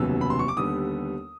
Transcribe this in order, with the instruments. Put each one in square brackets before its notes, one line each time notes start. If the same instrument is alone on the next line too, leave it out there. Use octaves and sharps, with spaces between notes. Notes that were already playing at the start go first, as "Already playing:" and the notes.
Already playing: [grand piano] F1 D#2 C#3 F#3 B3 E6
B5
C6
C#6
D6
D#2 D3 G3 B3 D#6